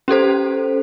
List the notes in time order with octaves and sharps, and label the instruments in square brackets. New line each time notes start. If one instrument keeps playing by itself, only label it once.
[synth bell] C#4 G4 A4 C5